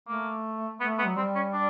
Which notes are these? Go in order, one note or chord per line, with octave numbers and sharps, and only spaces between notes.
A3 A#3
A3 B3
B3
F#3
G3 C4
C#4
D4